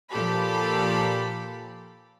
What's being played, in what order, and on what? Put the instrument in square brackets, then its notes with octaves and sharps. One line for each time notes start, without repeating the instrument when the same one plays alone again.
[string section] A#2 F3 G4 A4 B5